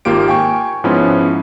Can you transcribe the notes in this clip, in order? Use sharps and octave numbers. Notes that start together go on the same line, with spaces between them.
G#1 A#3 F4 G4 D7
G5 G#5 C#6
G#2 F3 B3 C#4 E4